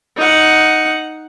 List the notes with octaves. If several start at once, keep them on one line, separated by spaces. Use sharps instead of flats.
D#4 F#5